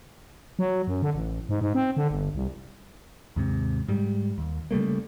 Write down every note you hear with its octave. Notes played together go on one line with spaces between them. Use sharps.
F#3
F#2
D3
A1
G#2
G#2
C4
D3
G1
C2
D#2 G#2 C3
G#2 G3
D#2
C#3 G3 A3 A#3